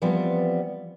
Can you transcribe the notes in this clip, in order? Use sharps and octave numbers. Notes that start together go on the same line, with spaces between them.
E3 F3 G3 B3 C4